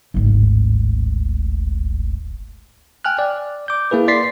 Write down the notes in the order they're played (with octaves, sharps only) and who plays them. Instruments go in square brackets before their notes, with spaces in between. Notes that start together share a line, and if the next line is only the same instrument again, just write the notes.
[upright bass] D1 G#1
[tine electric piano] G5 G#5 F6 F#6
D5
D6 G6
A#3 E4 G#4 B4
D5 C6 A6 B6 C7